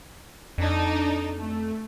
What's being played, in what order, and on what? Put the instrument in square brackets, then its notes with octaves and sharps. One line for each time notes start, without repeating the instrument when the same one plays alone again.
[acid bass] F2 [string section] D4 D#4
[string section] A3